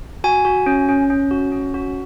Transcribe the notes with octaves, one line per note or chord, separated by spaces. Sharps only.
F#4 G#5
F#4
C#4
C#4
C#4
F#4
C#4
F#4